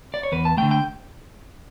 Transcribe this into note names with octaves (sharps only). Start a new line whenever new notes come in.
D5
C#5
E2 B4
A5
D3 A3 G5
G5